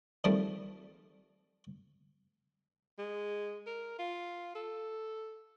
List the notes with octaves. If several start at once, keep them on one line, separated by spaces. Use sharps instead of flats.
D#3 F3 G3 A3 C4 D4
G#3
A#4
F4
A4